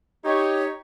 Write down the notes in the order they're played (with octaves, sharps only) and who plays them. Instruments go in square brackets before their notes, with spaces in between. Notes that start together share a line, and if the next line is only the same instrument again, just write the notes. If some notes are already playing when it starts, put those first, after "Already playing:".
[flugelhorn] D#4 [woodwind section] G4 C#5